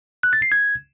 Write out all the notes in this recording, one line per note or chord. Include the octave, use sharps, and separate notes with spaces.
F#6
A6
C7
G#6